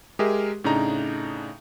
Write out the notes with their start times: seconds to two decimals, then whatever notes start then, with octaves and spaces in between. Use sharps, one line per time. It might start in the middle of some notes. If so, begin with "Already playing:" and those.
0.19 G#3 G4 G#4 A#4 D#5 E5
0.64 A2 C#3 D4 D#4 A#5